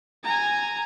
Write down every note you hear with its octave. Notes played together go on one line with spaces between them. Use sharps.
G#5 A#5